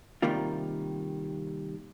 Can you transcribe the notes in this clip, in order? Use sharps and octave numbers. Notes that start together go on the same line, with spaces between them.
C3 D#3 G3 A#3 F4